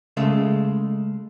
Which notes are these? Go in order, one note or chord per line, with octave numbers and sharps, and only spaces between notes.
C#3 G#3 A3